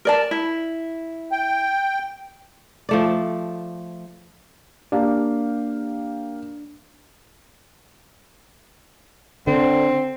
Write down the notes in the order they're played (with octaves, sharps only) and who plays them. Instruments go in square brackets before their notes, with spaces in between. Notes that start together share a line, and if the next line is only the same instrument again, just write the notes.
[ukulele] A#4 D5 A5
E4
[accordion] G5
[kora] F3 A3 D5
[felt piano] A#3 G4 F5 [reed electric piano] D4
[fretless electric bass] D3 [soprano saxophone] C4